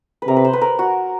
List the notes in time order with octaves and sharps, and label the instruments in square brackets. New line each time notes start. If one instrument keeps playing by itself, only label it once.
[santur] B4
[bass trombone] C3 [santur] A#4
[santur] B4
C5
B4
A#4
F#4